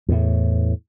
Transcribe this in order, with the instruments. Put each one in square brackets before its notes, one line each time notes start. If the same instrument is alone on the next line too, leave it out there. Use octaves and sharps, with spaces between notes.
[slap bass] E2 A2